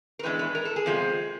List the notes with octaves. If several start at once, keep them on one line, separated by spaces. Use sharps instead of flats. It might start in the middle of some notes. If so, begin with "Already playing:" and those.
A#4
A2 E3 G#3 B3 D4 B4
B4
A#4
A4
G#4
E2 C3 F3 G#3